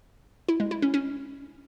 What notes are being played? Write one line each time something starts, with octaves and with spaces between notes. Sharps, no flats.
E4
G#3
E4
C#4
C#4